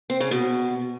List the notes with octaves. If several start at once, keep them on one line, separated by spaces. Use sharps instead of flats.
C4
C#3
B2